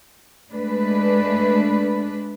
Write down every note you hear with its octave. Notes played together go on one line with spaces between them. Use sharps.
G#3 A3 D4 B4